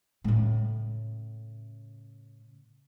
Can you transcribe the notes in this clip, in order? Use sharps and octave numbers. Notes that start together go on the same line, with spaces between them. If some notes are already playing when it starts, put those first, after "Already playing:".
A2 C#3